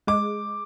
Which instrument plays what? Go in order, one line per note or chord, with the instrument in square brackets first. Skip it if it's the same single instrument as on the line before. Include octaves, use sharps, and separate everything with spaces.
[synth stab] G#3 [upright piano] D6